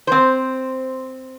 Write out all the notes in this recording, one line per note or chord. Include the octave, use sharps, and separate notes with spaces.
C4 C5